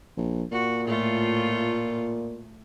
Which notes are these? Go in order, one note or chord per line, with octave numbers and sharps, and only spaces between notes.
A#1
A#2 F#4
A2 A3 F4